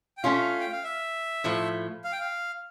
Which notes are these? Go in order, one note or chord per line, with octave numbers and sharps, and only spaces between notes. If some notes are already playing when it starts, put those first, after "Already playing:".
G5
A3 C#4 F4 F5
G5
F5
E5
A2 F3 A3
F5
G5
F5